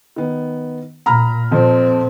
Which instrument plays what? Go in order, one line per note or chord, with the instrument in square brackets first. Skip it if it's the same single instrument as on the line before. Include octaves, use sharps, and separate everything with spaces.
[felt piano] D#3 B3
[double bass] A#2 [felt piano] A#5 B5 F6
[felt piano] F2 F3 [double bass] A#2 C4